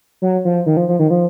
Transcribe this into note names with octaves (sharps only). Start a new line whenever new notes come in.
F#3
F3
D#3
F3
F3
D#3
F3